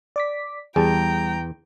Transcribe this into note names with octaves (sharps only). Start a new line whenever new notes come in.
D5 D6 B6
E2 G3 G#4 G5 A5 A#5